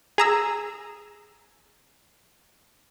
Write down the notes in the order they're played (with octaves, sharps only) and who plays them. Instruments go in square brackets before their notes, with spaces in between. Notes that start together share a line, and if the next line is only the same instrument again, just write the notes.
[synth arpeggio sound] G#4 A#5 E6